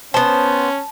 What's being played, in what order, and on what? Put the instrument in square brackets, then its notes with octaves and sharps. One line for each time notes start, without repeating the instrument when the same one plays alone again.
[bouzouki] B3 C5 [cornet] C#4 [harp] A5